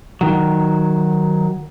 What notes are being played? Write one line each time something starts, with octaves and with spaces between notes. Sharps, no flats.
D#3 F#3